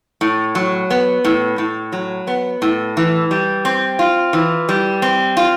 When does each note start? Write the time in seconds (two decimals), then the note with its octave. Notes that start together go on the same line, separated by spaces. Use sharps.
0.21 A2
0.55 F#3
0.90 B3
1.24 A2
1.58 A2
1.92 F#3
2.27 B3
2.62 A2
2.97 E3
3.31 G3
3.65 C4
3.99 F4
4.33 E3
4.69 G3
5.02 C4
5.37 F4